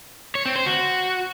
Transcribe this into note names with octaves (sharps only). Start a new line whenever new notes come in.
C#5
C4
C5
F#4